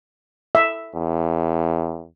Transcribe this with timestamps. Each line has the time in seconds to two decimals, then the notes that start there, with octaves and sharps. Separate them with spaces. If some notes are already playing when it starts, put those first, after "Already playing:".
0.55 E5
0.96 E2